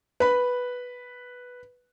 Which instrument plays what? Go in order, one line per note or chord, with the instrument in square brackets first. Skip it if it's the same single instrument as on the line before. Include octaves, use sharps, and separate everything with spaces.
[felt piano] B4 B5